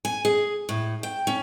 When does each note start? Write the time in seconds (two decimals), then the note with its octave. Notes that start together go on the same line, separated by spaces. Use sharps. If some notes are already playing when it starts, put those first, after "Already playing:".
0.05 G#5
0.25 G#4
0.69 A2
1.03 G5
1.27 C#4